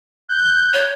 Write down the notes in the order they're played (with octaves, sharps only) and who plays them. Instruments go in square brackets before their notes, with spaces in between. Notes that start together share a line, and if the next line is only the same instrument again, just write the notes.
[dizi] F#6 [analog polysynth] G6
[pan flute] C#5